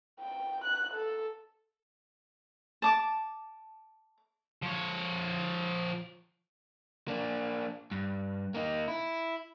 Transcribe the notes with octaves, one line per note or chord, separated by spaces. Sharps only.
G5
F#6
A4
A5 D6
F3 C#5
A#3 D4
G2
A#3 D#4
E4